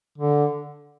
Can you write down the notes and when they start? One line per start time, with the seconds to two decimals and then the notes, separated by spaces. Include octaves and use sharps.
0.18 D3